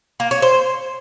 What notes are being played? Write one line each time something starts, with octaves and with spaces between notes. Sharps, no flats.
A#3
C#5
C5